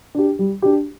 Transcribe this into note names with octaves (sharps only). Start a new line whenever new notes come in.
D4 G4
G3
D4 G4